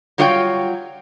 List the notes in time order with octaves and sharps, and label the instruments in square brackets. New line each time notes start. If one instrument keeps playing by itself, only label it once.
[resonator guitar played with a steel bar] F#3 G3 F4 C#5 F#5 G5